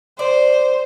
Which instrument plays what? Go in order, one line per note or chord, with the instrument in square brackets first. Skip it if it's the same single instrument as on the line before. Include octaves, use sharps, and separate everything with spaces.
[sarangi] C5 [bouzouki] D5